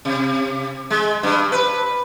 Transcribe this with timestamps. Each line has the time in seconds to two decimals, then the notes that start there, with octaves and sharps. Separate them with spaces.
0.05 C3
0.90 G#3
1.23 G2
1.52 B4